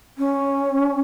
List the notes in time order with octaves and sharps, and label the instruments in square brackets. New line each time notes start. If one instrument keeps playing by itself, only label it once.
[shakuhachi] C#4